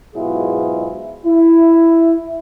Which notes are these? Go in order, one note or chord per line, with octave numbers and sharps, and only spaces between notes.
G#2 B2 F#3 E4 F4 G#4
E4